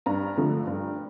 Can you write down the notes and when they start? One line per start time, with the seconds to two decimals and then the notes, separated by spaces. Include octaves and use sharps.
0.06 G2 A#5
0.37 D3 F3 A3
0.67 G2